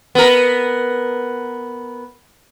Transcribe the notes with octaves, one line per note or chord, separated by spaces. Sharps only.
B3 A#4